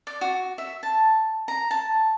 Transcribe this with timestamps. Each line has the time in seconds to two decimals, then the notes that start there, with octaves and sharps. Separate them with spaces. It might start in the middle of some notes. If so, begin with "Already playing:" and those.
0.07 D5
0.21 F#4
0.58 E5
0.83 A5
1.48 A#5
1.71 A5